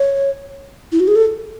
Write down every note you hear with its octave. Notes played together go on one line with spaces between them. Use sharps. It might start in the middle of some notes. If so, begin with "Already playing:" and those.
Already playing: C#5
E4
F#4
G#4
A4